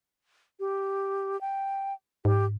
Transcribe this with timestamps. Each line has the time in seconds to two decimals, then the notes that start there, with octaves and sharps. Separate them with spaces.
0.60 G4
1.41 G5
2.25 G#2 G4